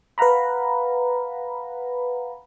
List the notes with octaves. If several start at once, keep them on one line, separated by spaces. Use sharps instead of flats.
B4 F5 F#5 A#5 B5